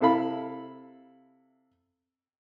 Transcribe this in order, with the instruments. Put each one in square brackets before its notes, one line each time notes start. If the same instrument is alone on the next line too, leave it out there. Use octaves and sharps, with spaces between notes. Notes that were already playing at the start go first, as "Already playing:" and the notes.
[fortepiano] C3 E4 A4 F5 B5